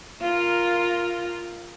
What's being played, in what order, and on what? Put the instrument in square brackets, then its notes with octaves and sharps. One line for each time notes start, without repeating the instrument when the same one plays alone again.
[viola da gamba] F4 A#4